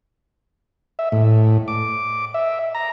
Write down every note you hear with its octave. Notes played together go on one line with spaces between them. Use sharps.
E5
A2
D6
E5
A#5